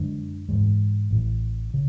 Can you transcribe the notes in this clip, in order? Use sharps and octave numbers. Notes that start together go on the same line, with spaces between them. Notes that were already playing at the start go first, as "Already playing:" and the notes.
Already playing: F#2 D3 G#3 D4
G#2 E3 G#3
A1 A2 E3
C#3